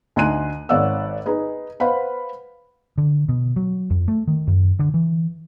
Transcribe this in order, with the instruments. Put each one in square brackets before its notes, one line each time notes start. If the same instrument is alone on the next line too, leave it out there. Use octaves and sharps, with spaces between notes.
[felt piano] D2 D#4 G#5 C6 F#6 D#7
G#1 C#5 D5 F5 F#5 E6
D#4 G#4 B4
B4 C5 F5 F#5 B5
[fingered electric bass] D3
B2
F#3
F2
A3
D#3
F#2
D3
E3